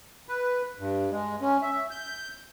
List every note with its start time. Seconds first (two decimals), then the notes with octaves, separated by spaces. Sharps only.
0.28 B4
0.79 G2
1.11 G#3
1.41 C#4
1.62 E5
1.91 G6